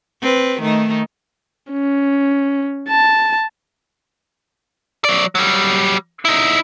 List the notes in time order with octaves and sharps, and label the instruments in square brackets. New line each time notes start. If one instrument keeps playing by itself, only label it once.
[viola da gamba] C4 B4
D#3 A3 D#4
[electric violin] C#4
A5
[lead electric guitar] F#3 D5
F#3 G3
D#4 E4